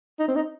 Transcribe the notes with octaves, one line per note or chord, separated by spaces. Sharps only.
D#4
C4
D#4